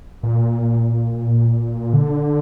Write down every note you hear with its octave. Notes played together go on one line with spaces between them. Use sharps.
A#2
D3